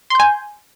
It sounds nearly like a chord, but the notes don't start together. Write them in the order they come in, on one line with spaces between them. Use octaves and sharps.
C6 G6 G#5